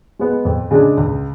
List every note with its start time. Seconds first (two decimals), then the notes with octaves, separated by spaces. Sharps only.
0.19 G#3 B3
0.45 F2
0.71 C#3 G#3 D4 G#4
0.97 C#2